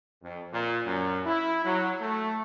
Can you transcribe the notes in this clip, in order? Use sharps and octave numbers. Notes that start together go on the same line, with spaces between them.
F2
A#2
F#2
E4
F#3
A3